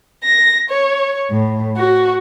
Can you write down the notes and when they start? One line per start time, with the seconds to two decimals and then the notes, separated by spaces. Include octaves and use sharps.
0.24 A#6
0.68 C#5
1.31 A2
1.77 F#4